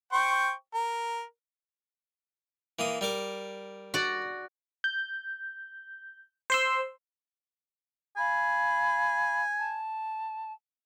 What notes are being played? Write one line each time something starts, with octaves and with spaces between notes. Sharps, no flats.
C5 G5 C#6
A#4
E3 A#3 D#6
G3 A#4 D6
F#4 D5
G6
C5 C6 E6
F5 G#5 B5
A5